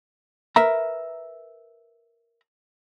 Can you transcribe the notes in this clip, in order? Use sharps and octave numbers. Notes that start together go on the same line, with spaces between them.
A#4 B4 E5 A#5